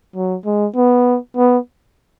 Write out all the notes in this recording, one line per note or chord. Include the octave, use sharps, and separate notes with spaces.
F#3
G#3
B3
B3